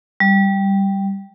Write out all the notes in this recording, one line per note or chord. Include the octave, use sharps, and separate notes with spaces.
G3